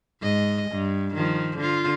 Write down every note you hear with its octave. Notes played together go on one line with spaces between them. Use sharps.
G#2 D#5
G2
D#3 F3
D3 F4